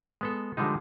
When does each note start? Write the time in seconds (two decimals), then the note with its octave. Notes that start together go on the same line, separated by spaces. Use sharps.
0.21 G#3 B3 A4
0.57 D3 F3 G3 G#3 D#4